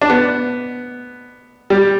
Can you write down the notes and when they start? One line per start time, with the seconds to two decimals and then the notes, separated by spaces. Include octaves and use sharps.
0.02 D4
0.10 B3
1.70 G3